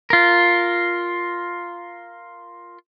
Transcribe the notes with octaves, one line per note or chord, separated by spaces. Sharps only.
F4 A#4